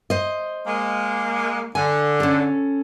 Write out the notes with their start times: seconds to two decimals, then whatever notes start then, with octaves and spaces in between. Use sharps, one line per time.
0.10 C5 D#5
0.67 G#3 A#3
1.75 D3 G#5
2.20 C#4 A4